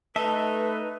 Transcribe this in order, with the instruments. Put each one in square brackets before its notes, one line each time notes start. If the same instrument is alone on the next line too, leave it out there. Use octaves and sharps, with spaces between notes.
[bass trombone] A3 [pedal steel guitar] D#4 D#5 E5 [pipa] A4 [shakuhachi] B4